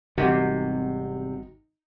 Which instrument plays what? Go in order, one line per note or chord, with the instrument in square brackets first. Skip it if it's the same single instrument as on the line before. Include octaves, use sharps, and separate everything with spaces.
[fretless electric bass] G#1 D#3 G3 [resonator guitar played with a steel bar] E2 C3 [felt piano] D#4 [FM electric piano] F#4